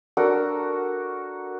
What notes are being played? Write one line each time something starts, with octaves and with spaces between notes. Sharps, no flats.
D4 F#4 A4 A#4